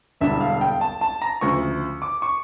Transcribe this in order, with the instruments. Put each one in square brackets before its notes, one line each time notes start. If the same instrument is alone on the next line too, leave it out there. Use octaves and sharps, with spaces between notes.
[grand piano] E1 E2 D3 G3 D4 E5
F5
G5
A5
A5
A#5
D2 C#3 F3 C#6
D6
C#6